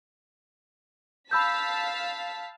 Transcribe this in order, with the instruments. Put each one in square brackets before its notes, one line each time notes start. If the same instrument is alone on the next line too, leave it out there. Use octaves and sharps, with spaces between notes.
[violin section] F5 A5 B6 [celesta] B5 E6 G6